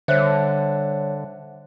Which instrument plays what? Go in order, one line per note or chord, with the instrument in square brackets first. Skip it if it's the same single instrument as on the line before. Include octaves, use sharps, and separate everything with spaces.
[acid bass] D3 [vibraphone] G3 C#5 [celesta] C5 E5 F#6